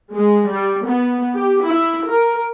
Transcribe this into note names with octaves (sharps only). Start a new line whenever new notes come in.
G#3
G3
B3
G4
E4
A#4